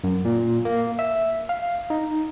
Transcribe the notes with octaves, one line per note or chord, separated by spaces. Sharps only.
F#2
A#2
A#3
E5
F5
D#4